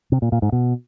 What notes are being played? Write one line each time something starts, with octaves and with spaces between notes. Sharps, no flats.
C3
A#2
A#2
G#2
B2